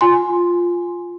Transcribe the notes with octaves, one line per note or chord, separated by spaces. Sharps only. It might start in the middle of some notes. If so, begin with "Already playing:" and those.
F4 G#5 C6